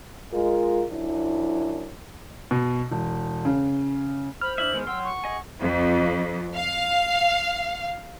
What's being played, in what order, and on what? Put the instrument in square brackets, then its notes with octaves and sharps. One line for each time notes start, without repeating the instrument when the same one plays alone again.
[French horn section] G#3 F4 A#4
F#2 F3 D4 E4
[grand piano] B2
E1
C#3
[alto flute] C5 [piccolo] B5 [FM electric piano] F6
[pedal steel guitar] D4 E4 E5 [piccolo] F#7
[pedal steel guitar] D#3 G#3 B3
[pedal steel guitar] F#3 G5 C6 [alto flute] F#5 [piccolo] E6
[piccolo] C#6
[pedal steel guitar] G#4 D#5 G#5
[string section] F2
F5